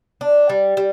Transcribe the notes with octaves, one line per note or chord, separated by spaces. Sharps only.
D4
G3
G3